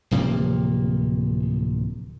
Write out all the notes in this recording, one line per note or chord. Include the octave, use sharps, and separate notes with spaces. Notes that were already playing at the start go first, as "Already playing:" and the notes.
D1 C3 F3 A#3